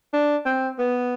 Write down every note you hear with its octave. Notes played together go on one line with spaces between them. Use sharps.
D4
C4
B3